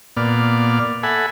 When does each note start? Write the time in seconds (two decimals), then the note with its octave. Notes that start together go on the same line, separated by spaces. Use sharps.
0.17 A#2 B3 D5 F6
1.03 A4 E5 F#5 G#5 B5